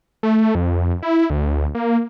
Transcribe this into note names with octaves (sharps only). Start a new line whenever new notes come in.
A3
F2
E4
D2
A#3